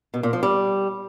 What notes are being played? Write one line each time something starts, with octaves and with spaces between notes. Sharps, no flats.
B2
A#2
F3
G3